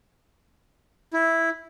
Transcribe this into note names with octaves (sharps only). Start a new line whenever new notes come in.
E4